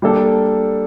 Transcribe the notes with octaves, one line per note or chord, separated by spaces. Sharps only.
G3 A#3 D4 A4